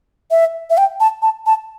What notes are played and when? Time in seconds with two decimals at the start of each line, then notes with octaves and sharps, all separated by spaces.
0.31 E5
0.70 E5
0.77 G5
1.00 A5
1.22 A5
1.46 A5